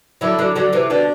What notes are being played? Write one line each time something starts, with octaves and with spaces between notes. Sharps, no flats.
D3 F#3 E4
D3 F#3
D3 F#3
C3 E3
B2 D3 D4